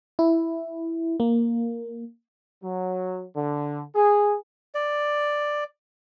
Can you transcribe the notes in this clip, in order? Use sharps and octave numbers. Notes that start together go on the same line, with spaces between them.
E4
A#3
F#3
D3
G#4
D5